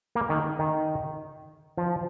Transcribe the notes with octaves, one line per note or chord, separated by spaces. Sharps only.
A#3
D#3
D#3
F3